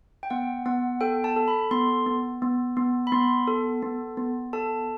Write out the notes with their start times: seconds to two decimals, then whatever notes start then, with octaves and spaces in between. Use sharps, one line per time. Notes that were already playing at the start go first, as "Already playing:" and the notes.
0.23 G5
0.30 B3 F#5
0.66 B3 F#5
1.01 A4 G5
1.24 A5
1.36 A4
1.48 B5
1.71 B3 C6
2.06 B3
2.42 B3
2.77 B3
3.07 B5
3.12 B3 C6
3.47 A4
3.82 B3
4.17 B3
4.53 A4 A5